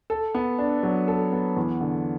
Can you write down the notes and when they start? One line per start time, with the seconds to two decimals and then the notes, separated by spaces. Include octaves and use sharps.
0.10 A4
0.35 B3
0.59 D4
0.83 F#3
1.08 A4
1.33 B3
1.57 E2
1.81 D3